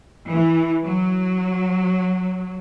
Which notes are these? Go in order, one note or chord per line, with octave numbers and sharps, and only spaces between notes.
E3
F#3